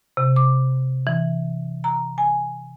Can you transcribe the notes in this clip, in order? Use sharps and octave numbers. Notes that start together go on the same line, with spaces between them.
C3
D6
E3
A#5
G#5